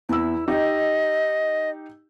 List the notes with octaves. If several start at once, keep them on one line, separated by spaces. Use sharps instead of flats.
E2 E4 E6
D#4 G4 D#5